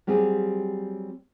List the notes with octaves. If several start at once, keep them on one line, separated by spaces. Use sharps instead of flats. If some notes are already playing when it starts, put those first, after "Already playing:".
F#3 G3 C4 G4 G#4